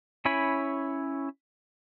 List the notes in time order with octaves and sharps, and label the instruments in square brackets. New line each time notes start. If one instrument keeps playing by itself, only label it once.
[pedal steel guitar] C#4 E4 C#5 G#5 B5